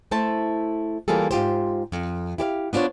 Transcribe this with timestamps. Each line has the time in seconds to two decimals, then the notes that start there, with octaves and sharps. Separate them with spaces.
0.11 A3 E4 C5 A5
1.08 E3 G3 A#3 F4 G#4 A4
1.31 G#2 F4 G4 C5
1.92 F2
2.38 E4 G4 C#5 F5
2.73 B3 D4 F4 C5 C#5